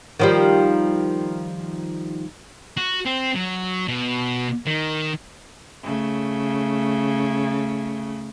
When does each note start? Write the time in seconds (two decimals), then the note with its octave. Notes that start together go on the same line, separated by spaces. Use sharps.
0.19 D#3 F3 G3
2.77 F#4
3.06 C4
3.36 F#3
3.88 B2
4.67 D#3
5.83 C#3 A3